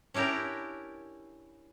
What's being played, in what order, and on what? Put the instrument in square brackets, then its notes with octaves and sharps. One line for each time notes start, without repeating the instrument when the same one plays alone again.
[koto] C#4 D4 E4 G4 A#4